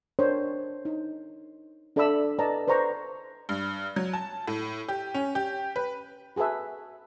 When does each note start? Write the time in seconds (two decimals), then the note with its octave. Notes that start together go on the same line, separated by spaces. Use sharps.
0.19 D4 A#4 C5 C#5
0.85 D#4
1.96 D4 A4 D5 E5 B5 E6
2.39 B4 D5 D#5 A5 A#5
2.68 B4 C5 D5 A#5 C#6
3.49 G2
3.96 F#3
4.13 A5
4.48 A2
4.88 G4
5.14 C#4
5.35 G4
5.76 B4
6.36 F#4 G#4 A4 B4 E5